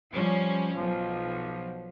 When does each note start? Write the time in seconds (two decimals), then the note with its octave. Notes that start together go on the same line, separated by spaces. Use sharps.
0.11 F3 G3 C#4
0.74 B1 F3